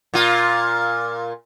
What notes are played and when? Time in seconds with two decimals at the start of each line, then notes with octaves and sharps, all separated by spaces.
0.14 A#2 F4